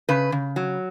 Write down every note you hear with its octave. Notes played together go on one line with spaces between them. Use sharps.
C#3 B4
C#3
F#3